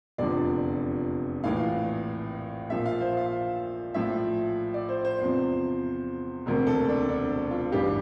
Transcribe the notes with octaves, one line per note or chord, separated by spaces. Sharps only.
F1 E2 D3 F3 D5
A#1 A2 E3 F5
A#1 A#2 F3 E5
F5
C5
F5
A#1 A2 F3 E5
D5
C5
C5
E2 C3 F3
E1 D2 C3 A#4
A4
D4
D4
F4
A1 G2 E3 G4